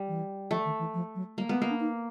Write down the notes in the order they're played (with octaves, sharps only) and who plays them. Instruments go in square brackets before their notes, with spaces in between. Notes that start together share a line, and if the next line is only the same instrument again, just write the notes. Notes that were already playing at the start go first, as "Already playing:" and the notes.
Already playing: [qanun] G3
[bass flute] E3
[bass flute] F3 [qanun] A3
[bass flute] D#3
E3
F3
F#3
[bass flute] G3 [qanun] A#3
[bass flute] G#3 [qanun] B3
[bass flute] G#3 [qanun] A#3
[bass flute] D4
D#4